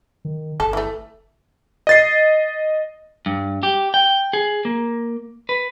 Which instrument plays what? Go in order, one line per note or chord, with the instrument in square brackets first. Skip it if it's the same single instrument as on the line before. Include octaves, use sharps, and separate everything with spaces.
[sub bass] D#3
[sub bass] G1 [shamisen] A4
[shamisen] E3 A3
[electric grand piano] D#5 A6 C7
[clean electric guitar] G2
G4
G5
G#4
A#3
B4